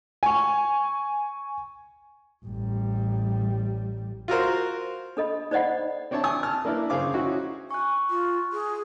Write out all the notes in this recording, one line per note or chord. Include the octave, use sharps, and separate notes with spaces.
G#5 C#6
A1 G3
F4 F#4 A#4 C5
D4 A4 D#5 B5
D#4 C5 D5 D#5 F#5 B5
C4 D4 C#5 E5 A5
G#5 C#6 D#6
A5 F6
A#3 D4 E4 A#4 B4
F#2 C#3 G#4 C5 F5 D6
C#4 D#4 E4 F#4
G#5 C#6 F#6
F4
G#4